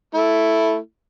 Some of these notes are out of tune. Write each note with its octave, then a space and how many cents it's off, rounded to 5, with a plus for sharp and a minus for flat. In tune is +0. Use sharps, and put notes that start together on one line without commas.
A3 +0 E4 +0